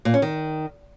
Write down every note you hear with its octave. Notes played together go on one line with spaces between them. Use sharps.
A#2
C#4
D#3